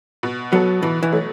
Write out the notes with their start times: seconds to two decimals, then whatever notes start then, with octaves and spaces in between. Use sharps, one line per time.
0.23 B2
0.52 F#3 B3 A4
0.83 B2 E3
1.03 E3
1.12 F#3 A3